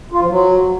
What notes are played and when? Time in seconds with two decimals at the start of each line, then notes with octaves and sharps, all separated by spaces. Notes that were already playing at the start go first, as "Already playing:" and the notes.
0.12 F4
0.21 F3
0.30 F#3